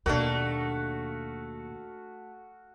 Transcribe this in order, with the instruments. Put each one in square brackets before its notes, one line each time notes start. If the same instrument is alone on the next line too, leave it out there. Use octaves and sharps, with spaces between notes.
[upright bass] D#2 B2 [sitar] A3 [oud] A#3 D4 [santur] F#4 F5